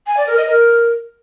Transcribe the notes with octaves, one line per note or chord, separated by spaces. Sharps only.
G#5
D5
A#4
D#5
A#4